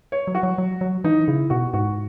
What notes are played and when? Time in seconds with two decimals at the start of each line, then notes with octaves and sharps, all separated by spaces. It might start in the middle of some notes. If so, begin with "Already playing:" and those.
0.12 C#5
0.27 F#3
0.35 F#4
0.43 F#3
0.58 F#3
0.81 F#3
1.04 E3 D#4
1.27 C#3 E4
1.50 B2 F#4
1.74 G#2 F#4